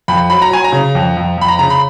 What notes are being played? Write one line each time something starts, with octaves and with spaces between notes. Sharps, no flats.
F2 B5
F#3 B5
A#5
F#3 G#5
A#5
C#3
F2
F2
F2 B5
A#5
C#3 A#5
B5